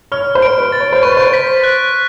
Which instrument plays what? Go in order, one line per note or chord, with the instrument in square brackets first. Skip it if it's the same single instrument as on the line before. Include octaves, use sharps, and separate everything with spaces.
[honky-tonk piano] C#5 [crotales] F6
[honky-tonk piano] C5
[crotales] D7
[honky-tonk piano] B4
[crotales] A6
[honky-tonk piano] C#5
C5
[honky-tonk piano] B4 [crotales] C#6
[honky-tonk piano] C5
[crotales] B6
F#6